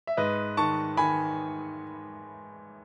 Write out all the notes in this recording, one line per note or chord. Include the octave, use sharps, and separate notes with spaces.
E5
G#2 B4 D#5
D#3 A5 C#6
D#3 G#5 B5